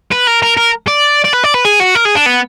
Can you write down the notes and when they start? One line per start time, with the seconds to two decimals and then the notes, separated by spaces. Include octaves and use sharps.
0.11 B4
0.27 A#4
0.42 A#4
0.57 A#4
0.88 D5
1.25 D5
1.33 B4
1.44 D5
1.54 B4
1.65 G#4
1.80 F#4
1.95 A#4
2.05 G#4
2.15 D4
2.26 B3